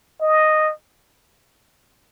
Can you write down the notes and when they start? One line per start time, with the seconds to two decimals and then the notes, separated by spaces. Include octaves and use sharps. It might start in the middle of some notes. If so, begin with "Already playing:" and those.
0.21 D#5